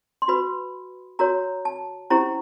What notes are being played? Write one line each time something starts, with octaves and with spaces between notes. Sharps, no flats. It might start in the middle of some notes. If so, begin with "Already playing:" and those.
C6
F#4 B4 B5
F#4 A#4 C#5 A#5
A5
C#4 E4 G4 C5 A#5